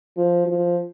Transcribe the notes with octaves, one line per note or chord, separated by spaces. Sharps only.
F3
F3